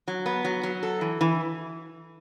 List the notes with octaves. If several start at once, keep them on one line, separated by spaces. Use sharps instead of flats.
F#3
B3
F#3
F#3
A4
E3
E3